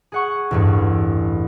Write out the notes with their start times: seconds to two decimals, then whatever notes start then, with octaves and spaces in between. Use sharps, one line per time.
0.12 G#4 F#5 C#6
0.51 A1 E2 G2